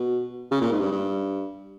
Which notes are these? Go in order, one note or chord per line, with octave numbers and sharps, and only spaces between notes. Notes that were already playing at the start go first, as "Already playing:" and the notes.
Already playing: B2
C#3
A#2
G#2
G2
G2